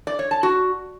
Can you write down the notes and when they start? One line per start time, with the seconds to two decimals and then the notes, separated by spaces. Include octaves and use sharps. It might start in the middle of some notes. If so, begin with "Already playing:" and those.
0.07 D5
0.19 C#5
0.31 A5
0.43 F#4